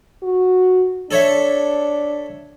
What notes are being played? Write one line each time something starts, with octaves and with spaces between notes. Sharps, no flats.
F#4
D4 A4 C#5 E5